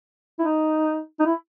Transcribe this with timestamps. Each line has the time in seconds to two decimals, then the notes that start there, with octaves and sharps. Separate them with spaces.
0.39 E4
0.42 D#4
1.20 D#4
1.26 E4